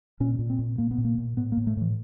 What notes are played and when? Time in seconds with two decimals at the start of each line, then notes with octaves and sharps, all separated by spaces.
0.20 A#2 C#4
0.39 A#2
0.50 C4
0.59 A#2
0.78 A#2 A#3
0.91 B3
0.98 A#2
1.05 A#3
1.18 A#2
1.37 A2 B3
1.52 A#3
1.57 A2
1.67 A3
1.77 A2 E3